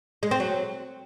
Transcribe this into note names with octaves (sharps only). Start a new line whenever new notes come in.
G#3
C4
F#3